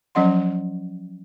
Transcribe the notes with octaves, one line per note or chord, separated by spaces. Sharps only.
F3 F#3 C#4 D#5 F#5 C6